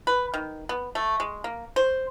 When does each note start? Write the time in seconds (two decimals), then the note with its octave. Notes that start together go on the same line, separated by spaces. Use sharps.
0.07 B4
0.34 D#3
0.69 B3
0.95 A3
1.20 G#3
1.44 A#3
1.76 C5